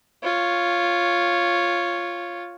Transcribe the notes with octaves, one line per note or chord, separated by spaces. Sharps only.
F4 C#5